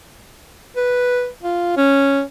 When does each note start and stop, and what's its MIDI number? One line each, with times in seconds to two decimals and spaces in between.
0.76 1.29 71
1.43 1.75 65
1.77 2.22 61